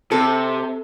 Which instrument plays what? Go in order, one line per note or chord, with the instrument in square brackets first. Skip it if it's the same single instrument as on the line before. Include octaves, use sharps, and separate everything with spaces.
[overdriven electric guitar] C3 [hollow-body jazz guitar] A4